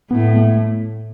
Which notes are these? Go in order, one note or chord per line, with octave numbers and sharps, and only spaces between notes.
A2 B3
A3